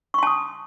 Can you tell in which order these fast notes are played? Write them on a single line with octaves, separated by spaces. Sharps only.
C#6 C6 A5 D#6